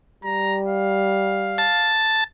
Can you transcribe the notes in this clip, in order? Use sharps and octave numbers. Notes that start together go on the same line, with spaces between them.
G3 A#5
F5
A5